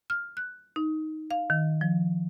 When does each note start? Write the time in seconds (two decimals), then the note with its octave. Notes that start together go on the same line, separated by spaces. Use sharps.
0.10 F6
0.37 F#6
0.76 D#4
1.31 F5
1.50 D#3
1.81 F3